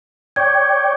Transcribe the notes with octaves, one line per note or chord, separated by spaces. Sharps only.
C#5 D5 G5 G#6